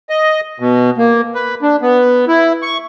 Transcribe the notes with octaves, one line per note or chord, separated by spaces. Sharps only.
D#5
B2
A#3
B4
D4
B3
E4
C#6